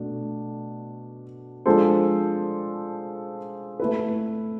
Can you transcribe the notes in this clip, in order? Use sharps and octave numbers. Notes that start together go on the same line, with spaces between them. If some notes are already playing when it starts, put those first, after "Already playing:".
Already playing: B2 A3 D4
F3 G#3 D4 A4 C5
A3 E4 B4